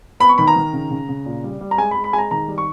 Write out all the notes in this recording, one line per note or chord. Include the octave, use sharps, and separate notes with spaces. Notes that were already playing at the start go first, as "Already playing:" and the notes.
B3 B5
C#6
D#3 B5
A#5
D#3
C#3
C#3
C#3
A#2
G3
G3
A#5
G#3 G#5
B5
G#3
B5
G#3 G#5
A#5
D#3 A#5
G3
C#6